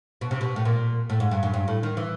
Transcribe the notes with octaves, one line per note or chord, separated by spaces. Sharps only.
B2
C3
B2
A2
A#2
A2
G#2
G2
F#2
G2
A2
D#3
E3